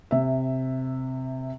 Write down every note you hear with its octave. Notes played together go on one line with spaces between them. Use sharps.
C3 E5